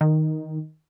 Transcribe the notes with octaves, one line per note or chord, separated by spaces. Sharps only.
D#3